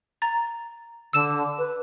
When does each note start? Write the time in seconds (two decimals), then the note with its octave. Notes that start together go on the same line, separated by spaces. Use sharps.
0.22 A#5 A6
1.13 D3 E6 E7
1.58 B4